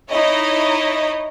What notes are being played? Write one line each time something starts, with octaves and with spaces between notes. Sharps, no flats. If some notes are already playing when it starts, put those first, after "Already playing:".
D#4 E4 C#5 D#5